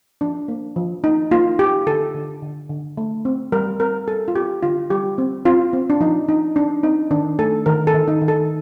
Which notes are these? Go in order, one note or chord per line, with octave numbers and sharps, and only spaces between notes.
F3 D4
A#3
F3
A#3 D#4
A#3 F4
A#3 G4
D3 A4
D3
D3
D3
A3
C4
G3 A#4
C4 A#4
G3 A4
F4
C4 G4
D3 F4
G3 G4
C4
C4 F4
C4
D4
F3 D#4
F3 D#4
C4 D4
C4 D#4
D#3 D4
A3 A4
D#3 A#4
A4
D#3
D#4
D#3
A4